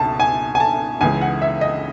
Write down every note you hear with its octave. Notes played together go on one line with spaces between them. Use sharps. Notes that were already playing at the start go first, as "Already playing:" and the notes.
Already playing: C#2 B2 A5
G#5
G#5
A5
C#2 C#3 E3 G#3 G#5
F#5
E5
D#5